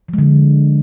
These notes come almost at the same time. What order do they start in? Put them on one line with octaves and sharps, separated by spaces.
F3 G#3 D3